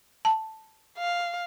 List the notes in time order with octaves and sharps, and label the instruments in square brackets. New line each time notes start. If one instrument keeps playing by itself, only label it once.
[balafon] A5
[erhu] F5